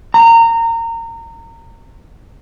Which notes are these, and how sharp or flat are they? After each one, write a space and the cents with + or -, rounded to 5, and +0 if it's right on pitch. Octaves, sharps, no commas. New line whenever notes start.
A#5 -25